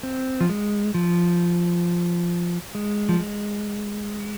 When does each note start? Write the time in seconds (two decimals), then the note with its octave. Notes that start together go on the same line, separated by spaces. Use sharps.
0.03 C4
0.41 F3
0.49 G#3
0.94 F3
2.75 G#3
3.09 F3
3.20 G#3